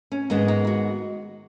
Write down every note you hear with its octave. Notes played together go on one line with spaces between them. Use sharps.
C#4
G#2 D#3 G#3 B3 D#4
D#4
F#4